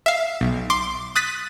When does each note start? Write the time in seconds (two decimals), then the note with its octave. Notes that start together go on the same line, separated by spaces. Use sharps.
0.06 E5 F5
0.41 B1
0.70 C6 D6
1.15 D#6 F#6 A6 B6 D#7